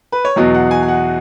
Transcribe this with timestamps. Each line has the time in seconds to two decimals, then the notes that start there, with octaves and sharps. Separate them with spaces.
0.12 B4
0.25 C#5
0.36 E2 B2 F#3 D#5
0.54 F#5
0.71 G#5
0.83 G#5
0.88 F#5